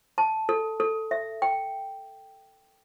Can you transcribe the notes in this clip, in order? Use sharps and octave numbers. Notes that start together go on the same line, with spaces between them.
A5
A4
A4
E5
G5